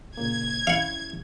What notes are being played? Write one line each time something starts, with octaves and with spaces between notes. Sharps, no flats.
A#2 C#3 A#3 G#6
C#4 E4 F5 F#5